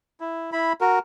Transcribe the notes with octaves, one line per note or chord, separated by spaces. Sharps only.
E4
E4 B5
F#4 A#4